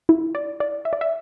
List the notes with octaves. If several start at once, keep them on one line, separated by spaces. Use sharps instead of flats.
E4
D5
D5
E5
D5
E5